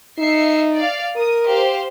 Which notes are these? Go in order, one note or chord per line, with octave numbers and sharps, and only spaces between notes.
D#4 E5 C7 C#7
D5 F5
A#4 D#6
G4 C5 F5